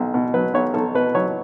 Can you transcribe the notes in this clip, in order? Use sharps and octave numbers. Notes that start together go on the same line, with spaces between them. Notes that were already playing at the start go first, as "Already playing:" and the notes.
Already playing: B1
B2
F#3 B4
B1 C#5
B1 A4
B2 B4
F#3 C#5